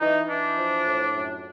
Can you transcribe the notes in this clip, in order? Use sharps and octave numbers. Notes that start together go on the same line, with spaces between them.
E3 D#4
E3 D4
F3
A2
F#2